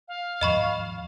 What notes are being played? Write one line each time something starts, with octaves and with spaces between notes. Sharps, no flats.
F5
D#2 G#2 F3 D#5 B5 C#6